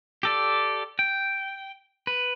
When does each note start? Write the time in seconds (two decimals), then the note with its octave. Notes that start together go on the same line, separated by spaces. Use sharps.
0.23 G4 A4 D5
0.99 G5
2.07 B4